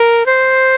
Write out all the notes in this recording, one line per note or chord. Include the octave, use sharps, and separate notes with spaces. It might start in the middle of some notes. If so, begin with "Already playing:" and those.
Already playing: A#4
C5